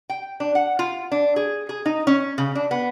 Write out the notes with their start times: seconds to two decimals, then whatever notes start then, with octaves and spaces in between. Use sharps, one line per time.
0.10 G5
0.40 D4
0.55 F#5
0.79 F4
1.12 D4
1.36 G#4
1.69 G#4
1.86 D#4
2.07 C#4
2.38 C#3
2.55 D4
2.71 B3